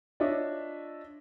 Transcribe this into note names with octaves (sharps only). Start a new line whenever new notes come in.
D4 F4 C#5 D#5 E5